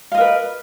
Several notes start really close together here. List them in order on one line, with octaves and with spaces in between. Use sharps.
F5 D#5 A#4 B4